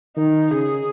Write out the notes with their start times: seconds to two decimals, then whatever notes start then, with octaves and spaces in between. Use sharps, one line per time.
0.17 D#3 D#4
0.51 C#3 G#4